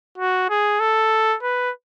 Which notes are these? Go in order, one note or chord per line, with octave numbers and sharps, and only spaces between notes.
F#4
G#4
A4
B4